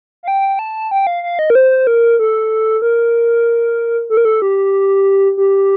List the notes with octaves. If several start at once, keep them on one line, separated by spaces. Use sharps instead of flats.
F5
G5
A5
G5
F5
F5
D#5
A#4
C5
A#4
A4
A#4
A4
A#4
A4
G4
G4